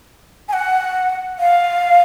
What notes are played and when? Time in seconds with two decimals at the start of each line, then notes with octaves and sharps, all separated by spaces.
0.49 G#5
0.53 F#5
1.39 F5